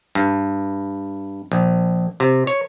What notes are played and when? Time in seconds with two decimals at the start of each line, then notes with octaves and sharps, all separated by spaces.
0.15 G2
1.52 A#1
2.20 C3
2.47 C#5